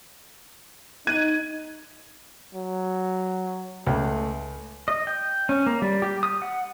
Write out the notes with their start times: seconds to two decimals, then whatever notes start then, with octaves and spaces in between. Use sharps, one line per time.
1.07 D#4 F#6 G#6 D#7
2.55 F#3
3.86 C#2 A3
4.88 D#5
5.07 G5
5.49 C#4
5.66 A#3
5.82 G3
6.02 G4
6.23 D#6
6.42 F#5